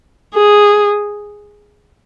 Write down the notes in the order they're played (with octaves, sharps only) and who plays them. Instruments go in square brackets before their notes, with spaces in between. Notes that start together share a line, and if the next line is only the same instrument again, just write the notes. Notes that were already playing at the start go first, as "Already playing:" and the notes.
[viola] G#4